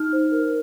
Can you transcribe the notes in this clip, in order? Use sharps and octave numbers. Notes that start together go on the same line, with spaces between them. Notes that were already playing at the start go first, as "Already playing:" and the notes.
Already playing: D#4 F6
C5
A#4